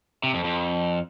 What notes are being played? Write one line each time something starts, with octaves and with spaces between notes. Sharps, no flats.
C3
F2
F2